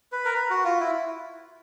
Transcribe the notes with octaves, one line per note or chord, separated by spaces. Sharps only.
B4
A#4
B4
F#4
F4
E4